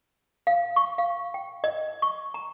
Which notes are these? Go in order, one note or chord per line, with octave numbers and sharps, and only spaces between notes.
F5
C#6
F5
G5
D#5
C#6
A#5